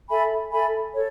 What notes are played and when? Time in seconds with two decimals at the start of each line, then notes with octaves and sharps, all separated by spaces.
0.08 A4 E5 G#5 B5
0.51 A4 E5 G#5 B5
0.93 A4 C#5